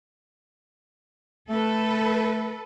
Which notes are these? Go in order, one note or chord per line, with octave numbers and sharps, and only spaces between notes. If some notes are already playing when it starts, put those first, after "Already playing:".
A3 A4 B4